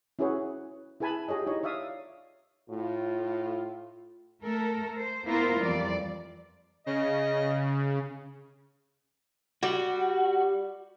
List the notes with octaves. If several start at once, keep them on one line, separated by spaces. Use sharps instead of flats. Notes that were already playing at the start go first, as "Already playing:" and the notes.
C#4 E4 F#4 G#4 B4 C#5
E4 G#4 B4 G#5 A5 B5
F4 G4 G#4 C#5 D#5
D#4 E4 C#5 D#5
C#5 D5 E5 F5 D#6
A2 F4
A3 A4 A#4
C5
A#3 B3 E4 F4 A#4 C5
F2 E3 G3 D5
C#3 D#5
G3 F#4